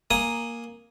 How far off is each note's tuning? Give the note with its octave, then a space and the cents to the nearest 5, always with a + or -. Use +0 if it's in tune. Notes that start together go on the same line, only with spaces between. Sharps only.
A#3 +0 G#5 +0 D#6 +0